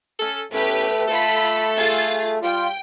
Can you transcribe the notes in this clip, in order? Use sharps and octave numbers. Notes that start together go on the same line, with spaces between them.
C#4 A4
E2 A2 A3 C#4 G4 B4
F4 A4 B5
F4 G#4 A6
G3 F4 G5